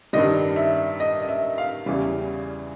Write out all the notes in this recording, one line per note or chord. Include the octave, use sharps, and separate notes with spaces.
G2 D#3 G3 D#5
E5
D#5
D#5
E5
F5
E2 C#3 E3 G3